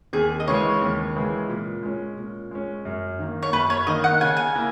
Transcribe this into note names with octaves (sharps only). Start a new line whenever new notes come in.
D#2 G#4
D#5
C#3 E3 G#3 C#5
D#2
C#3 E3 G#3
A#2
G#3 C#4
A#2
G#3 C#4
F#2
D#3 A#3
C#5
F#2 B4
C#5
D#3 A#3 D#5
F#5
C#3 G#5
G#5
A#3 E4